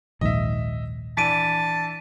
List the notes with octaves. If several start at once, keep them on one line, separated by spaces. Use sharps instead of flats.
A#1 D#2 G#2 D#5 E5
E3 D4 A5 B6 D7 D#7